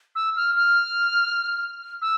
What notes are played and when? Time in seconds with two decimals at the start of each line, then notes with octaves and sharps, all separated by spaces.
0.15 E6
0.36 F6
0.57 F6
2.02 E6